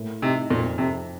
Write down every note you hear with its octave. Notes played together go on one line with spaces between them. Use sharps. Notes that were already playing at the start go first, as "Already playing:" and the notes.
Already playing: A2 A#3
C3 D#4
F2 A#2
F2 C3